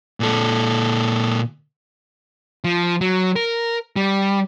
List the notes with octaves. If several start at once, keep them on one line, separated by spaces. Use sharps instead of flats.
A#2 A4
F3
F#3
A#4
G3